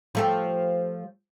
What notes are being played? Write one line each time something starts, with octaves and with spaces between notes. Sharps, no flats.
F3 A3 G4